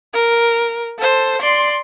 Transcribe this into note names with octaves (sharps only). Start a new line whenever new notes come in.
A#4
A4 C5
D5 C6